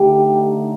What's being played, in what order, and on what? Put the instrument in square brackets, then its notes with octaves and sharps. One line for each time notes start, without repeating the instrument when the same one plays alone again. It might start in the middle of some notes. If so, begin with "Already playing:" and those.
Already playing: [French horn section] D3 A3 D#4 G4